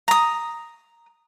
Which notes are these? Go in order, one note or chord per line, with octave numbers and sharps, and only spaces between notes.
A#5 D#6